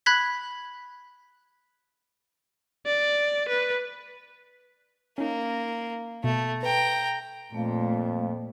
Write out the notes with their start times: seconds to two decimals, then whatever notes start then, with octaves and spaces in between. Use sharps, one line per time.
0.06 B5 F#6 G#6 B6
2.86 D5
3.48 B4
5.18 A#3 C#4 D#4
6.24 B2 A3
6.63 B4 G5 A#5
7.54 F2 A#2 A3 F5